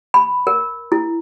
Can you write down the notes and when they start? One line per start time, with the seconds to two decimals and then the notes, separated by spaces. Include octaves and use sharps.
0.14 B5
0.47 A#4
0.92 E4